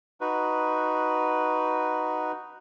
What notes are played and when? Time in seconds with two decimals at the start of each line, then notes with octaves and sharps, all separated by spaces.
0.21 D#4 F#4 B4